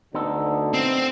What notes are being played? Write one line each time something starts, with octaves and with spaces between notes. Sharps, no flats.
D2 D3 B3 D#4 A4
C4